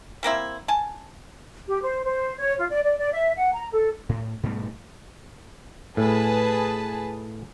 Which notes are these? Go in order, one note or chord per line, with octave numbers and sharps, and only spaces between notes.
G3 A#3 C4 E4
G#5 A5
G4
C5
C5
C#5
F4
D5
D5
D5
E5
F#5
A#5
A4
A2
G#2 B2 G3 A3
A2 G#4 B4 A5